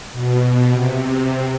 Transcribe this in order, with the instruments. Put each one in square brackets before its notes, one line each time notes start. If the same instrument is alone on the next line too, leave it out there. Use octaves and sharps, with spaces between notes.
[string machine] B2
B2
C3
C3